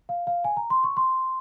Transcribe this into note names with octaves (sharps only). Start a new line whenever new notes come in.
F5
F5
G#5
A#5
C6
C#6
C6